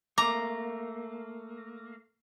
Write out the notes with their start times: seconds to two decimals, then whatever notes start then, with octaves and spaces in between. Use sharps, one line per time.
0.18 A3 A#3 A#5 D6